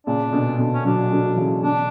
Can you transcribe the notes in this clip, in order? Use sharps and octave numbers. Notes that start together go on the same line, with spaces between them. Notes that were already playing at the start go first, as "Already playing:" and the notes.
A#2 C#3 D4
B2 D3
B2 D3
C#4
D3 F#3 D4
D3 F#3
C#3 E3
B2 D3 D4